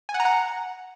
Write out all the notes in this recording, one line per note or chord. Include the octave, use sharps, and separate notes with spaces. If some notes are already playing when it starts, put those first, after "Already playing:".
G#5
F#5
A#5
F#5